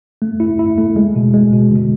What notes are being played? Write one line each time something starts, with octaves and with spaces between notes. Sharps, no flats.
A3
E4
E4
A3
G#3
B2
G#3
B2
D3